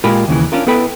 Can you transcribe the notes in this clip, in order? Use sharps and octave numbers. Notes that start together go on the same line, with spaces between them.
A#2 G#3 F4 G4 A#4 B5
D#2 C#3 E3
C#4 D4 F4 A#4
B3 E4 A4 B4 G5 B5